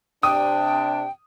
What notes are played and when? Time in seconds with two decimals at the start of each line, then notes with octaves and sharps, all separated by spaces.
0.23 C3 D4 G5 D#6